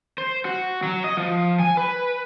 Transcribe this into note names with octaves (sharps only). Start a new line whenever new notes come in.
C5
F#4
F#3
D#5
F3
G#5
B4